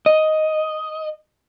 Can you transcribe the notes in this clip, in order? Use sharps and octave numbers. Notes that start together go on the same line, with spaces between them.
D#5